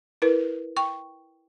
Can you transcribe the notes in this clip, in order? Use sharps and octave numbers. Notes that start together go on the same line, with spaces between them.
E4 A#4 B4
G5 C#6